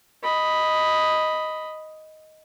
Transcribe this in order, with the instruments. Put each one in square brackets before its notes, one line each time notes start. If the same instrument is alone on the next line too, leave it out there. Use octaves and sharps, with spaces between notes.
[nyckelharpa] D#5 B5